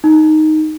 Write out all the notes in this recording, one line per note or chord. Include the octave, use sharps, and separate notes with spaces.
D#4